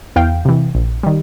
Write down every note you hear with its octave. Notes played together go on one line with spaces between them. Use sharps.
E2 F5 G5
C3 E3
A#1
D#3 G3